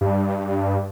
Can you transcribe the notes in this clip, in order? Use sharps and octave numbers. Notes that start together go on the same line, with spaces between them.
G2